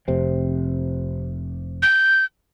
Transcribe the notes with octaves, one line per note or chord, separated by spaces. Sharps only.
F1 C3 C4
G6